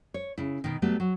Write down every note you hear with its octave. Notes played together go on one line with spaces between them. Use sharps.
C#5
C#3 E4
B2 D#3
F#3 G3 A3 B3
F#3